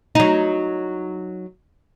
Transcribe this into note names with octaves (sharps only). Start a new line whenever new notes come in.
F#3 D#4